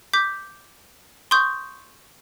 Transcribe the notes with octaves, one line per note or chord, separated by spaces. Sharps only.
D6 G6 B6
C6 C#6 D#6 G6